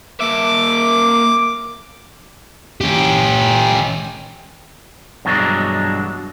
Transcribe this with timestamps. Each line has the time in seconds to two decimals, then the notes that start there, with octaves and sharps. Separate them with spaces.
0.20 A#3 E5 D6
2.81 C#4 G4
5.25 G2 B2 E3 F#3 G#3 D4